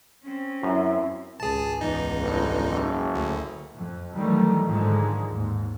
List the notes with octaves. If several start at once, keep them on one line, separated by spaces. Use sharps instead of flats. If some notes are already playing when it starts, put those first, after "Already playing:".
C4 C#4
F#2 E4
G#1 C#2 G#4 A5
E2 D#4
G1
F#1
D2
F2
D#3 E3 F#3 G3 A3
G#2 D3 D#3 F3 G#3
D#2 G#2